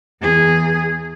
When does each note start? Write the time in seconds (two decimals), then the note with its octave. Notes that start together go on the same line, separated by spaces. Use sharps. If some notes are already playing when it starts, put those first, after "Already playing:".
0.21 E2 G#4